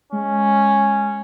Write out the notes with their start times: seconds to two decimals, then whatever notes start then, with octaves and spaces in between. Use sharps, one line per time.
0.12 G#3 C#4